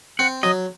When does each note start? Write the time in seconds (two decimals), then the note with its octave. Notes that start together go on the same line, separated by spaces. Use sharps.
0.19 C4 F#5
0.43 F#3 D#5